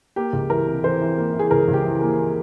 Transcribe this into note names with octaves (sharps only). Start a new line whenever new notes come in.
A#3 G4
C#2
E3 A#4
C3
E3 C5
E3
A#3
E3
G#4
C#2 A#4
C#2
G4
E3
A#3